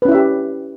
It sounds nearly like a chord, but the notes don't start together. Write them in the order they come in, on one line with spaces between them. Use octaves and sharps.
B4 C#4 E4 E5 G4